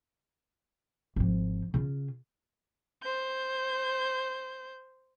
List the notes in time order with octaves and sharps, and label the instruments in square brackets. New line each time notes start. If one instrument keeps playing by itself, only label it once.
[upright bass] G#1 F3
C#3 F4
[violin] C5 G6